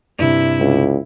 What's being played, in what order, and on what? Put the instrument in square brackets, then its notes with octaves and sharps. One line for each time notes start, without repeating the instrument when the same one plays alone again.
[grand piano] G2 C3 [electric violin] E4
[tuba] C#2